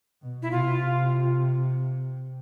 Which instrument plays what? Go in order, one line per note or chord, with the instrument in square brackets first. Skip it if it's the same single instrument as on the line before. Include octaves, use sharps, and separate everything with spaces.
[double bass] B2
[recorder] E4
[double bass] C3 [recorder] F4